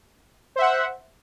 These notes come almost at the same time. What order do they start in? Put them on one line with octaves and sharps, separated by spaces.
C5 E5 F#5